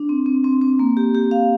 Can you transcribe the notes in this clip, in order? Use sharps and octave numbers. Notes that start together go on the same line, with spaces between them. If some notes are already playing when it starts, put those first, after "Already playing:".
Already playing: D4
C4
C4
C4
C4
A#3
G4
G4
F5